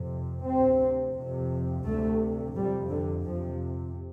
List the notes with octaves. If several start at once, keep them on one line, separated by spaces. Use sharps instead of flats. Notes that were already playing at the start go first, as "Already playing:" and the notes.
Already playing: F2 C3
D2 C3 C4
F2 C3
D2 C3 A3
F2 C3 G3
D3
F2 C3 F3